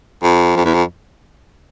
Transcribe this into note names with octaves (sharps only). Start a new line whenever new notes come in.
F2
F2
E2
F2